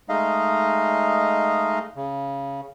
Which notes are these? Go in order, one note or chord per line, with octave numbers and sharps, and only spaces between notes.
G#3 A3 D#4 D#5 F5
C#3